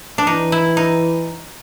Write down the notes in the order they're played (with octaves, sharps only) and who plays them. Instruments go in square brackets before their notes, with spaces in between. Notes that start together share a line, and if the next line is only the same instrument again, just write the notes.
[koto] D4
[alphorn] E3 [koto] D#4
[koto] E4
D#4